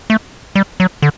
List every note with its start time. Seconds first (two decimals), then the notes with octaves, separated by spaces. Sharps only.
0.10 A3
0.55 G3
0.80 F#3
1.02 D3